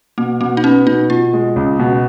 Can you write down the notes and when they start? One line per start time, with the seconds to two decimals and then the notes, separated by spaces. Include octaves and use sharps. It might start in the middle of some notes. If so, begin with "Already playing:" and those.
0.18 B2 A#3
0.41 B2 A#3
0.57 D#4
0.64 B3 C#4
0.87 B2 D#4
1.10 B2 F4
1.33 G#3
1.56 C#2
1.79 B2